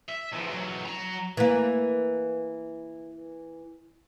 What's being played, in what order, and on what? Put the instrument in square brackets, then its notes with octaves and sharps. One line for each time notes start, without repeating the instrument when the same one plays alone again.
[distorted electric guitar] E5
E2 F3
E2 F#3
F#3 A#5
[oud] E3 A#3